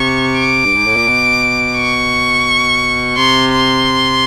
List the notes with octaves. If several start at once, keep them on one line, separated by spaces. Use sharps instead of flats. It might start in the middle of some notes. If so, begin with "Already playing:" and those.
Already playing: C3 C#6
D6
G2
G#2
A2
A#2
B2
C#6
C3 C6
C6